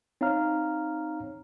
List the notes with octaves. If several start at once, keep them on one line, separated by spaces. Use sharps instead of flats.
C4 D#4 C#5 F5 A#5 F6